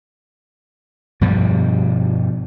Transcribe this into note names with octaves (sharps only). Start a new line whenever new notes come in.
G2 B2 F3 G3